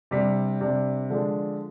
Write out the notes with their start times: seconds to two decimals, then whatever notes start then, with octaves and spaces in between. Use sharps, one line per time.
0.11 C3 G3 D4
0.61 C3 G3 D4
1.10 D3 F3 G#3 D4